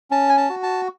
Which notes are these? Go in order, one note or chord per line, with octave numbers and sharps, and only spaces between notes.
C#4 A5
G#5
A5
F#4
A5